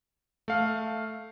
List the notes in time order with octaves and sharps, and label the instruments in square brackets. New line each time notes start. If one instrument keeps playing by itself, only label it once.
[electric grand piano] A3 F5